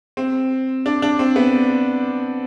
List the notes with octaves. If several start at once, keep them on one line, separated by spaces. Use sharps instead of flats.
C4
D4
D4
C4
B3